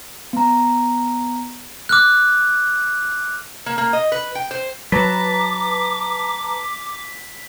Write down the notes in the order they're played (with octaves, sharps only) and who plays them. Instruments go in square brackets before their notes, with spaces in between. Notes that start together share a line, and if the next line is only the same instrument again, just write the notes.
[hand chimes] B3 A#5
[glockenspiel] D6 F6 F#6
[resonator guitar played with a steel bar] A#3
A#3
D#5
B4
G5
C5
[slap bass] F#3 [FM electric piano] B4 A5 A#5 [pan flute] D6 [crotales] B6